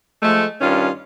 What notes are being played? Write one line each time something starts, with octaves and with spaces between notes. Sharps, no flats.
F3 G#3 A3
G2 D#3 C#4 F4